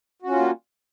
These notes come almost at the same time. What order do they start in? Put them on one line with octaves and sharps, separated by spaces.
F#4 C#4 F4 G3 A#3